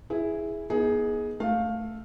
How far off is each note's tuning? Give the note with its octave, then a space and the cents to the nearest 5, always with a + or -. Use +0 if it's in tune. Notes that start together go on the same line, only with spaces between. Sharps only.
E4 +0 G#4 +0
B3 -35 D#4 +20 G#4 +10
A3 +5 F5 +10